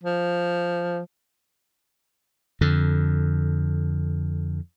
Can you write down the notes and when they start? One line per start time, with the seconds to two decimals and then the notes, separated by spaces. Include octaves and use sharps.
0.04 F3
2.61 F2 D3